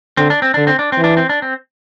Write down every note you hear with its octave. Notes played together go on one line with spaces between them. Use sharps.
D3 C4
D4
C4
D3 D4
C4
D4
C4
E3
D4
C4
D4
C4